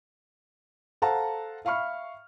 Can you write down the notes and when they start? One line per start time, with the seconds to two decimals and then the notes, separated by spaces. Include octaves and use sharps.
1.02 A4 C5 F5 F#5 A5 A#5
1.65 E5 F5 B5 C#6 F6